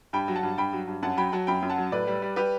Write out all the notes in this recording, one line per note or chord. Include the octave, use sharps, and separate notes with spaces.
G2 G5 B5
F#3
F#5 A5
G2
G2 G5 B5
F#3
G2
F#2 F#5 A5
F#3 G5 B5
F#3 F#5 A5
F#2 G5 B5
F#2
F#5 A5
F#3
A2 B4 D5
G3
G3
G3 G4 B4